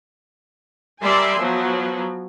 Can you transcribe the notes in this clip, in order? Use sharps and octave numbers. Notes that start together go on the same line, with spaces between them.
G3 A#4 D5 E5 G#5 C6
F3 F#3 B3